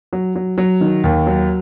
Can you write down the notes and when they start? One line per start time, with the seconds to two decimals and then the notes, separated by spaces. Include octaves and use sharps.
0.13 F#3
0.35 F#3
0.58 F#3
0.81 D#3
1.04 D#2
1.27 F#3